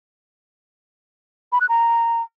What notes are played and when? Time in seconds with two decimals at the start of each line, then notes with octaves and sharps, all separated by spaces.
1.52 B5
1.61 F#6
1.69 A#5